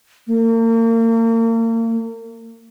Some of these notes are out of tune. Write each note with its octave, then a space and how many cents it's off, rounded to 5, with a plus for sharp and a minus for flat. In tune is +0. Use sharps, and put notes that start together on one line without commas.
A#3 -35